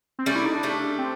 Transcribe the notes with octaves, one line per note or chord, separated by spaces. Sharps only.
C4
G3 A3 C#4
E4
D#4
D4
G3 A3
C4